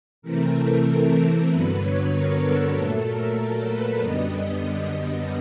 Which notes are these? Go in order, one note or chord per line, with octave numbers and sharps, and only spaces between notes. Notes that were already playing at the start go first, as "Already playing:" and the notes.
C3 E3 A3 C4 A#4
A4
A4
A#4
G2 D3 F#3 B3 B4
C#5
A#4
A4
A#2 F#3 A3 A4
A#4
A#4
B4
F#2 D3 G3 B3 D#5
D#5